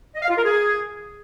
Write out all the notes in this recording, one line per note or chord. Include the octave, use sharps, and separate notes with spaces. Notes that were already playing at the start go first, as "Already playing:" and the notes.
D#5
F5
F4
A#4
G#4